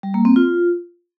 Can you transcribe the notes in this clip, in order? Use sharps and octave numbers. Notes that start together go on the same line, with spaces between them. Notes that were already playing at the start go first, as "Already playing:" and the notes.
G3
A#3
C4
F4